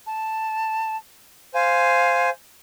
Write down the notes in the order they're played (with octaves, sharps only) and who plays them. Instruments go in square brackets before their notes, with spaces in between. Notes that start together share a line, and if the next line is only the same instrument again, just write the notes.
[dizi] A5
[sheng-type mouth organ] C5 G#5 [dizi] F5